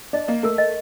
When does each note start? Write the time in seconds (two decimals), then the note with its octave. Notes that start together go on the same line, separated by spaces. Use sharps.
0.13 D4 D#5
0.28 A#3 D#5
0.43 A3 A#4
0.58 D#5